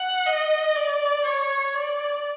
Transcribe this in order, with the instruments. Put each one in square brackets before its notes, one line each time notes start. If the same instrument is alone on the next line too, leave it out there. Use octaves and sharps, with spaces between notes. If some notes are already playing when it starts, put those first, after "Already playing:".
Already playing: [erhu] F#5
D#5
D5
C#5
D5